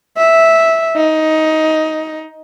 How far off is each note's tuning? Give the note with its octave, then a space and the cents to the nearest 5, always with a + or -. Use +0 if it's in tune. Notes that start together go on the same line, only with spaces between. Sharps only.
E5 -5
D#4 +15